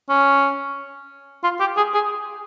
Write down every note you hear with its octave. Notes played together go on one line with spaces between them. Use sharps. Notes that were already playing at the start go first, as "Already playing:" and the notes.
C#4
F4
G4
G#4
G#4